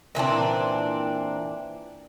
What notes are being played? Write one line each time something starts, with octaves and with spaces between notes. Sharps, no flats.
A#2 E3 C4 D4